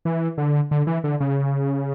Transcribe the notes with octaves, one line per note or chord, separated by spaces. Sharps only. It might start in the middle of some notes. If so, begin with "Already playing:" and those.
E3
D3
D3
E3
D3
C#3